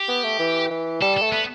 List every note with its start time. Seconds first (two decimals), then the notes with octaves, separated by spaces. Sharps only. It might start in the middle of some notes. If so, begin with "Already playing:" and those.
Already playing: G4
0.08 B3
0.24 A3
0.39 E3
0.70 E3
1.01 G3 A4
1.17 A4
1.22 A3
1.32 B3